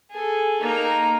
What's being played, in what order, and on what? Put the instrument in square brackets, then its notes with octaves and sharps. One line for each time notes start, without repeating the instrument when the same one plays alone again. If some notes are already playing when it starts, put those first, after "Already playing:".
[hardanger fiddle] G#4 A4
[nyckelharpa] A#3 A#4 [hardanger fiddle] D#4 A#5